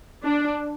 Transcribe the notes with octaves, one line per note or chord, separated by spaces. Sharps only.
D4